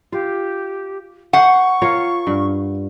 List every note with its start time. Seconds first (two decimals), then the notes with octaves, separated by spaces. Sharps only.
0.12 F4 G4
1.33 C5 F#5 C#6
1.82 F4 A#4 C#5
2.27 G2